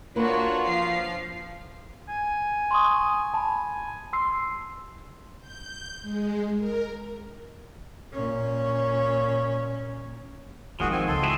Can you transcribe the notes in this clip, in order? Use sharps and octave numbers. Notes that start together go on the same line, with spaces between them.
A#3 D4 F4 F#4 A#4 B4 C#5
F3 F5 C7
G#5
C6 C#6 D#6
A5 B5
C6 E6 C7
G6
G#3
A#4
A#2 C#4
G#1 G#2 D#3 F3 F#4 G#4
C4 G#5
C#2 A4 C6
E4 F#4 G#4